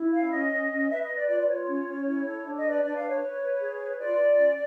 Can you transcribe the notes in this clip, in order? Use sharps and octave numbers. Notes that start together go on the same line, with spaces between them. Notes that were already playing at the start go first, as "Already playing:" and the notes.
Already playing: E4
C#4 F5
C#4 D#5
C#4
C#4
B4 E5
D#5
B4
D5
F4 D5
D5
F4 C#5
C#4
C#4
E4
A4
D4
D#5
B4
D5
D4 D5
F5
B4
C#5
B4
B4
G#4
B4
F4 D5
F4
C#4